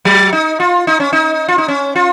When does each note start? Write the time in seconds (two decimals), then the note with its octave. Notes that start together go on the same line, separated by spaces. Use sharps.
0.05 F#3
0.33 D#4
0.60 F4
0.87 D#4
1.00 C#4
1.13 D#4
1.48 F4
1.58 D#4
1.68 C#4
1.95 F4